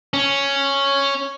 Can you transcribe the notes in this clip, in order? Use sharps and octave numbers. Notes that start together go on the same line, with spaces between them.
C#4